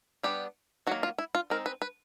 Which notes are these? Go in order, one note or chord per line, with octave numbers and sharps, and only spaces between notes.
G3 B3 D4 G4
D#3 F#3 A#3 F#4
F4
E4
F4
G#3 C4 D#4 A#4
B4
B4